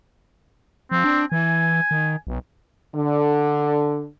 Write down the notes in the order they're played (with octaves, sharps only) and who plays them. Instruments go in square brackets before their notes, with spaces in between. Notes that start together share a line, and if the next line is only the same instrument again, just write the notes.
[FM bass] F3 [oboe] C4
[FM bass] D4
[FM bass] E3 [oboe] G#5
[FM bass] D#3
B1
[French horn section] D3